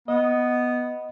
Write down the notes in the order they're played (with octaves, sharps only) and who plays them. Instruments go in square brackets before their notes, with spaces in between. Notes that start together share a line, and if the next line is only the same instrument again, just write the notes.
[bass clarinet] B3 [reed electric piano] D#5